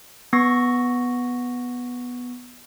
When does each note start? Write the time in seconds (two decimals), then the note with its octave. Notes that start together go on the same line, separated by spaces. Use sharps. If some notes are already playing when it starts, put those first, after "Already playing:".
0.33 B3 C#6 A#6